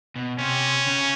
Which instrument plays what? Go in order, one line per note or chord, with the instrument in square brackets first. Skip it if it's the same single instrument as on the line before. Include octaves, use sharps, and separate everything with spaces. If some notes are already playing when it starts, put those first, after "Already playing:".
[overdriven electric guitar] B2
[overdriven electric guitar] C3 [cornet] C#4
[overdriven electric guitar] C#3